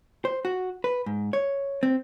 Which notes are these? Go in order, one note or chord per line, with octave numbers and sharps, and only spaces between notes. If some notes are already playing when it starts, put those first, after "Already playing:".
C5
F#4
B4
G#2
C#5
C4